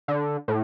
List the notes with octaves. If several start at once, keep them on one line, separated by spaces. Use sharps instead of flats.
D3
A2